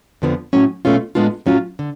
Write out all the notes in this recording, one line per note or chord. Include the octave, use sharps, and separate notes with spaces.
F2 D3 F3 B3
A2 F#3 C#4
B2 A3 C#4 F4
A2 G#3 B3 D4 F4
A2 F#3 C#4 F4
D3